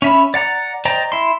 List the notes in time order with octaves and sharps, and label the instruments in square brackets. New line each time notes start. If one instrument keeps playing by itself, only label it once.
[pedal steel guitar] C#4 E5 B5
D5 F#5 A#5
C5 D5 D#5 G5 A#5
E4 C6